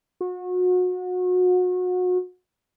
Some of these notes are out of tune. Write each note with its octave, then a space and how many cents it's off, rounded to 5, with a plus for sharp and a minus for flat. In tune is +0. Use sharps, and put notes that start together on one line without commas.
F#4 -30